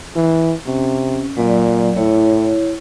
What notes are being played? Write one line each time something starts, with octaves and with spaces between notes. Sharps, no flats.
E3
C3 C#4
A#2 F#3 D5
A2 E4 C#5